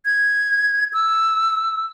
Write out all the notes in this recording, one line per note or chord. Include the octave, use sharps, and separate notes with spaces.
G#6
E6